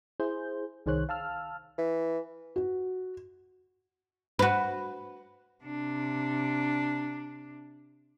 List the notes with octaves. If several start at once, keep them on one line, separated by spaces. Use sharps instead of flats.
E4 G#4 C5 G6
C2 D#3 G#4 C5 C#5 F#6
F5 A5 E6 F6
E3
F#4
F#4 B4
C3 D4